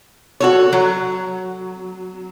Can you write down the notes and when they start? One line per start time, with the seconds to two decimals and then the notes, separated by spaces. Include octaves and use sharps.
0.40 F#4 A4 C#5
0.73 F#3